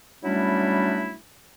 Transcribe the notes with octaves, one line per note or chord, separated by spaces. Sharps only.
F#3 G3 A3 C#4 D4 E4